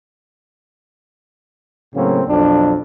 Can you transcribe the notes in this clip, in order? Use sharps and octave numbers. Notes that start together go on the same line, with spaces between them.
A2 C#3 F#3 A#3 C4 C#4
B1 F2 D4